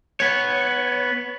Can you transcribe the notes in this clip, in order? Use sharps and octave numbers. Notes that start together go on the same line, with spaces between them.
B3 C#5